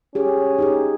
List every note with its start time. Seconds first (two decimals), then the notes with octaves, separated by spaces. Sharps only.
0.15 C#4 G4 G#4
0.59 D#4 G4 G#4